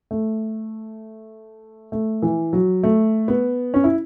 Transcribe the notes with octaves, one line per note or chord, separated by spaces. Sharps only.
A3
A3
E3
F#3
A3
B3
C#4
E4